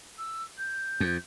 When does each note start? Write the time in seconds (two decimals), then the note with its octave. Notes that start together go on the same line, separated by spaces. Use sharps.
0.18 E6
0.57 G6
1.00 F2